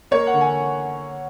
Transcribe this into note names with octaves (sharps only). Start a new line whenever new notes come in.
A#3 C#5
F#5
D3
G#5